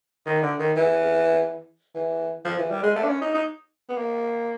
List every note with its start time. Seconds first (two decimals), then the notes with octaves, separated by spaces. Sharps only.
0.26 D#3
0.42 D3
0.59 D#3
0.76 E3
1.95 E3
2.45 F3
2.58 E3
2.70 G3
2.83 G#3
2.96 A3
3.04 D4
3.09 C#4
3.21 D#4
3.34 D#4
3.89 B3
3.97 A#3